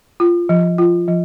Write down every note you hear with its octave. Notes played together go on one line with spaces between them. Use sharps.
F4
F3
F4
F3